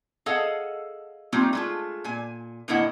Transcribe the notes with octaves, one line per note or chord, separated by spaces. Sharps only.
G#4 A4 D#5 F5 F#5
G3 A3 A#3 C4 D#4 F4
G#3 A3 F4
A#2 G#5
A2 D3 A#3 E4 D#5 F#5